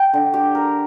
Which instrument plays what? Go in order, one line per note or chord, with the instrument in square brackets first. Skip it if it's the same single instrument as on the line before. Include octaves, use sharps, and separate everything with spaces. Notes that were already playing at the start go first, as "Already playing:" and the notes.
Already playing: [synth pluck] G5
[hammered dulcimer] D3
G4
A#4